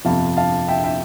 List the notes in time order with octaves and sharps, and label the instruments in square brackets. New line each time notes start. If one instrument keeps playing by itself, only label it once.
[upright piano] G1 F2 C3 F3 F5 A5
F5 A5
E5 G5
E5 G5